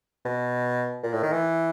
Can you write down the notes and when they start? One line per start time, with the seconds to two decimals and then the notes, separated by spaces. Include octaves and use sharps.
0.25 B2
1.03 A#2
1.13 A2
1.23 D#3
1.33 E3